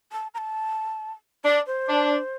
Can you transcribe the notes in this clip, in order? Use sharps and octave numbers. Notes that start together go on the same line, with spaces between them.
A5
A#5
A5
D4 D5
C5
D4